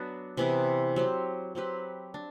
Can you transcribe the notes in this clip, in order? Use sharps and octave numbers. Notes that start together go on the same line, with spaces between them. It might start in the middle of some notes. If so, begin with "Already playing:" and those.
Already playing: F#3 B3 D4 F#4
C3 E3 B3 E4
F#3 C4 G4
F#3 C4 G4 B4
D4